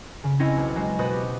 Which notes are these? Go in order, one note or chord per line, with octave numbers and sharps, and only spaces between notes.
C#3
C4 C#4 E4 D#5 G#5
B1
F#3 G#3 C4
B2 B3 F#4 B4 C5 D#6
G4